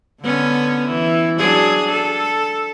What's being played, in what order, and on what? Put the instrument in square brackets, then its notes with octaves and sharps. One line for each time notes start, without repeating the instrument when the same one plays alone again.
[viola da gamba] D3 B3 C#4
E3
F#3 D4 G#4
A4